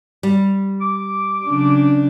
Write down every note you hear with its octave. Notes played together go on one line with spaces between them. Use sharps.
G3
D6
C#3 F#3 D4